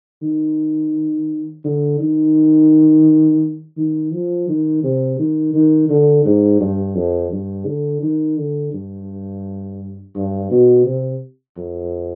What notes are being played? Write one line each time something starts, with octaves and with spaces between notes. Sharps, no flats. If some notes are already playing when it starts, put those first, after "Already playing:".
D#3
D3
D#3
D#3
F3
D#3
C3
D#3
D#3
D3
G#2
G2
F2
G2
D3
D#3
D3
G2
G2
B2
C3
F2